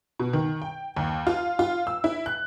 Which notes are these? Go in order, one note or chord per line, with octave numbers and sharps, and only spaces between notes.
B2
D#3
G5
D#2
F4
F4
E6
E4
F#6